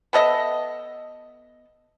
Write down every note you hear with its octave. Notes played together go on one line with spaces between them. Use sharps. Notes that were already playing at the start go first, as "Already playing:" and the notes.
B3 A4 D#5 E5